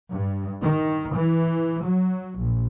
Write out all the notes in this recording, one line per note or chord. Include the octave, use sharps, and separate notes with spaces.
G2
D#3
E3
F#3
A#1